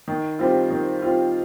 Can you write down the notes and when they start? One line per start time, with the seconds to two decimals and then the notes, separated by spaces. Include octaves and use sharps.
0.08 D#3
0.39 G3 C4 F4
0.70 D#3
1.02 G3 C4 F4